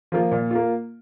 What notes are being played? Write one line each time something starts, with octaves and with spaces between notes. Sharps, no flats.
F3 A#3 F4
A#2
A#3 F4